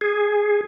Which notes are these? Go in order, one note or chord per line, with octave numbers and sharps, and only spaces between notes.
G#4